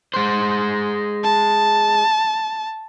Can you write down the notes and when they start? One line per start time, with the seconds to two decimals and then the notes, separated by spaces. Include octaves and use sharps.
0.14 G#3 C5
1.24 A5